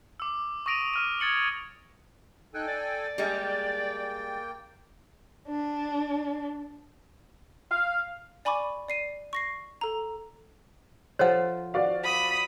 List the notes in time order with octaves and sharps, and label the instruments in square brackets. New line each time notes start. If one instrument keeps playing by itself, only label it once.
[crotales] D6 E6
C#6 D#6 A#6 D7 D#7 F7
D6 F6 D#7
D#6 G#6 A6 C#7 F#7
[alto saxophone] D#4 [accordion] A4 G5 G#5 [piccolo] F#6
[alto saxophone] D5 [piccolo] A6
[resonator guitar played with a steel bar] G3 G#3 [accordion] A#3 G5
[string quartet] D4
[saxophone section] F5
[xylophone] D5 G#5 B5 C#6 D6
D5 C7 D#7
C#6 A#6 C7
A4 A#5
[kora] F3 A4 C5 [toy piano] C#5 F#5
[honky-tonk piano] F#4 D5 F5
[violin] B5 D#6